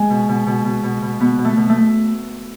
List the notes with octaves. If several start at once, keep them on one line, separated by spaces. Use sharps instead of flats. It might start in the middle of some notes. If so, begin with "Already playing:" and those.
Already playing: G#3
B2
B2
B2
B2
B2
B2
B2 B3
B2
A3
B2
A3